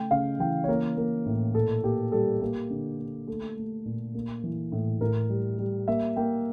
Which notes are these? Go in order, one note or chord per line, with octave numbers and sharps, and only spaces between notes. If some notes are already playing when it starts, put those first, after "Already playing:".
Already playing: C#3 A3 G5
C#3 F5
E3 G5
C#5
A#3 A#4
A#3
A2
A#2 A4
A#3 G4
G3 A4
A#3 G4
D3
A#3
A3 A4
A3
A#2
A#3
E3
A2
A2 A#4
G3
G3
A#3 E5
A#3 G5